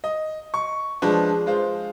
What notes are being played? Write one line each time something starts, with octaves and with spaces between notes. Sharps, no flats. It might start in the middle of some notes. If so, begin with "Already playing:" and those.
D#5
C#6
F3 G#3 D4 B4
G#3 F4 C5